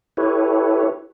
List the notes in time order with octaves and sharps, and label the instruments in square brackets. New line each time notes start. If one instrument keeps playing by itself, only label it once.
[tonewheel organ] E4 G4 A4 B4 C#5